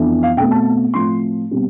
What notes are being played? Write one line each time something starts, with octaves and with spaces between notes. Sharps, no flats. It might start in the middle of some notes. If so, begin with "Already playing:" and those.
Already playing: F2 E3 B3 D4
F5
B2 A3 C4 G5
A5
A2 F3 C4 C6
B2 G3 C4